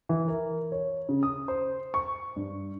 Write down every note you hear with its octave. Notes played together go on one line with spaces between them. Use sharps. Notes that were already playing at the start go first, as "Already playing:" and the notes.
E3
A#4
C#5
C#3
D#6
C5
C#6
G2